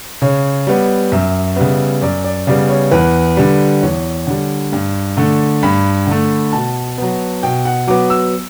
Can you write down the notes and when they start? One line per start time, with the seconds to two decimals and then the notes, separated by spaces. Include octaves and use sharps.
0.22 C#3 C#5
0.67 G3 B3
1.12 F#2 E5
1.56 C#3 G3 B3
2.02 F#2 D5
2.24 D5
2.47 C#3 G3 B3 D5
2.69 C#5
2.91 E2 B4
3.37 D3 G3
3.82 E2 C#5
4.27 D3 G3
4.72 G2
5.17 D3 A3
5.63 G2 B5
6.07 D3 A3
6.53 B2 A5
6.98 F#3 B3
7.43 B2 G5
7.65 F#5
7.87 F#3 B3 D6
8.10 E6